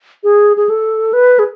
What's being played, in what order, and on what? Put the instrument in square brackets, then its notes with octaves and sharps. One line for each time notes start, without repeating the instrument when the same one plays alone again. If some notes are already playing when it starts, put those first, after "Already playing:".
[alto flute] G#4
G#4
A4
B4
G#4